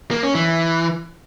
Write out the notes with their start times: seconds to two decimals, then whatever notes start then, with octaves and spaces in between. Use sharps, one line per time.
0.11 A#3
0.23 C#4
0.35 E3